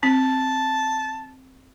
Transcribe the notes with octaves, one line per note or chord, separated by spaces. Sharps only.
C4 A5